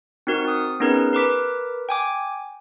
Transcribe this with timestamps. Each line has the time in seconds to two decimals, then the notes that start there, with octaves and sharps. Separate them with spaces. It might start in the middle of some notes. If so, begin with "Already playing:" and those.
0.27 C4 D#4 F#4 A#4
0.45 C4 D#6
0.80 B3 C#4 D#4 G#4 A#4 B4
1.13 A#4 B4 D6 B6
1.89 G5 G#5 D6